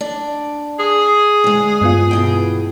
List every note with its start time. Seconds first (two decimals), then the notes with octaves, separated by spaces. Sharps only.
0.01 D4 D5
0.79 G#4
1.44 D2 G#3
1.81 G2 B3 F4
2.11 B2 E3 G5